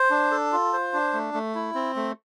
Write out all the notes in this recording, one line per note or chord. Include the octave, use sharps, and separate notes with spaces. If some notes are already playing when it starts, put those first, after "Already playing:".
Already playing: C5
D4
A4
F4
C5
D4
A3
A3
E4
C4
A3